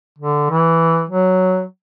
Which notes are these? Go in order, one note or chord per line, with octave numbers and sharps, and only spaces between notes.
D3
E3
F#3